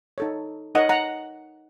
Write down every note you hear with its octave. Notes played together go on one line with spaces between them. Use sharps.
D#4 A4 C#5
D#4 A#4 C#5 D#5 F#5
F#5 A#5